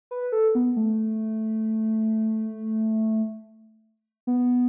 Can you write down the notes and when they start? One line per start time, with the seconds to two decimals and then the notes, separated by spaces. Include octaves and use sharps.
0.11 B4
0.32 A4
0.55 B3
0.77 A3
4.27 B3